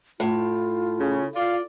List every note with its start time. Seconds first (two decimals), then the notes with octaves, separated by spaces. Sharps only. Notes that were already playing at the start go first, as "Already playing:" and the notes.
0.20 A2 F4
1.00 C#3 C#4
1.35 F4 D5 F5